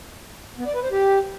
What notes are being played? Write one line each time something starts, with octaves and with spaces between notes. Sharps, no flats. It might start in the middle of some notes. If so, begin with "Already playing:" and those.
B3
D5
B4
C5
G4